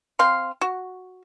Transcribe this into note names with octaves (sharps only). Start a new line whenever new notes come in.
C4 F5 C6
F#4